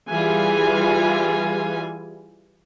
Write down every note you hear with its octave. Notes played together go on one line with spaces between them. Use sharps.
E3 G3 F4 G#4 G#5